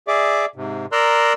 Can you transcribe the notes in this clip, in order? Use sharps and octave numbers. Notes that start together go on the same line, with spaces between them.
G#4 D5 E5 D6
G#2 C3
A#4 D5 A#5 C6 E6 F#6